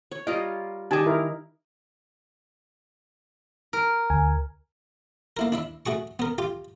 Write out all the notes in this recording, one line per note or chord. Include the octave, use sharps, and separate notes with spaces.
C#5
G3 F4 A#4 D#5
D#3 D#4 G4 G#5 A5
E4 A#4
A#4
D2 G#5
A#3 E4 A#4
D4 E4 E5
A3 F#4 G#4 C#6
B3 A#4
F4 G4